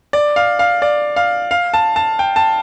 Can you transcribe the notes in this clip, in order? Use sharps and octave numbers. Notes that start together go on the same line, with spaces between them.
D5
F5
F5
D5
F5
F5
A5
A5
G5
A5